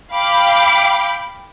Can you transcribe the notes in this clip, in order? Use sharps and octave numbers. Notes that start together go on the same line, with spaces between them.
F5 G5 B5 D6